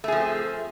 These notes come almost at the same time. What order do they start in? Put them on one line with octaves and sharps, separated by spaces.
A3 G#4 F3 C4